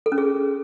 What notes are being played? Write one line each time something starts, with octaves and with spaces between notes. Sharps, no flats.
A4
C#4
G#4